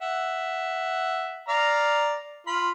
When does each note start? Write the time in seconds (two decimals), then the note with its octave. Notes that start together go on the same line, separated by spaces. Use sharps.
0.02 E5 F#5
1.48 D5 F5 A#5
2.47 F4 B5 C6